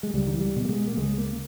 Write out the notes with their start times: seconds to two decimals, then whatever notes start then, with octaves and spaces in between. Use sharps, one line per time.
0.03 G#3
0.14 C#2 G3
0.27 D#3
0.34 E3
0.41 G3
0.56 B2
0.65 A#3
0.69 G#3
0.87 A#3
0.97 C#2 G#3
1.18 A#3